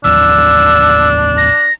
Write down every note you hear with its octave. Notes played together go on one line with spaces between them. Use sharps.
A1 D#2 F3 D4 E6
A#6